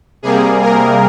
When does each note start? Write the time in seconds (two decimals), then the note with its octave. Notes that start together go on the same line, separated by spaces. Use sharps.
0.23 C3 G3 A#3 G#4
0.62 A#4